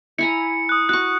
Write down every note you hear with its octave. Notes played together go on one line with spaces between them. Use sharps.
E4 G#5 A#5 C#7
D#6 F#6
F#4 C#6 F#6